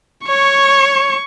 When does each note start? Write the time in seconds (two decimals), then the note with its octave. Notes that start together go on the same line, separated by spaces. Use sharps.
0.27 C#5 C#6